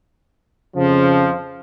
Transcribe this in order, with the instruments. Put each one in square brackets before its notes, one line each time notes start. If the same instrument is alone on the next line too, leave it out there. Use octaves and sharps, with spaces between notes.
[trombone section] F2 F3 [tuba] C#3